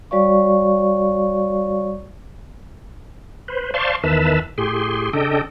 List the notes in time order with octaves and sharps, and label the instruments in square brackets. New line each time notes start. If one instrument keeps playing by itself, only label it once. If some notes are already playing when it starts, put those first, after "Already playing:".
[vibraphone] G3 F#4 C#5 D5 F5 C#6
[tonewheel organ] B4 C5
C5 D5 F5 A5 C6 C#6
E2 D#3 B4 E5 A5
A2 G4 G#4 C6
C#3 D4 A4 D#5 G5